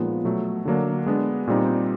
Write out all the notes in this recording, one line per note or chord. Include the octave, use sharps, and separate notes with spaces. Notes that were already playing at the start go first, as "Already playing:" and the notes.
Already playing: A#2 F3 G#3 B3 D#4
B2 F#3 A3
D3 F#3 A#3 D4
G#3 B3 D4
A#2 G3 C4 D#4